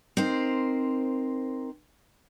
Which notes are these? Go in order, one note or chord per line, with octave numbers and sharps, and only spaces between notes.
C4 D#4 A#4 C5